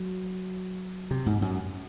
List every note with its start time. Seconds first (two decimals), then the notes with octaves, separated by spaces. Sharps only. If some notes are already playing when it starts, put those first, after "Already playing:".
Already playing: F#3
1.11 C3
1.26 G#2
1.42 F#2